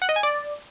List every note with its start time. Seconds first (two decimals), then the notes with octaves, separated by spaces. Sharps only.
0.02 F#5
0.09 D#5
0.16 G#5
0.23 D5